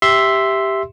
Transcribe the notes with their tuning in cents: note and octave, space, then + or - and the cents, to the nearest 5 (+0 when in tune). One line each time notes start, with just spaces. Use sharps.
G4 +0 E5 +0 C6 +0